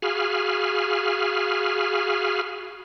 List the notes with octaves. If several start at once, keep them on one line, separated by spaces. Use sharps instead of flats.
F#4 G#4 F5 G#5 B5 F6